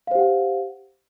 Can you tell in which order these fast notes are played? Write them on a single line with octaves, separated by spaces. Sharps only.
F5 C5 G4 F#5